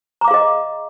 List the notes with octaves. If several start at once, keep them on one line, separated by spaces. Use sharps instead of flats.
G#4 D#5 F5 A#5 D6